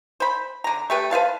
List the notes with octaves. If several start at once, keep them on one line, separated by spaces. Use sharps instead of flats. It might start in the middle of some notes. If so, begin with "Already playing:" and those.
C5 B5
D3 A#5
A3 G4 B4
B4 C5 F5 A5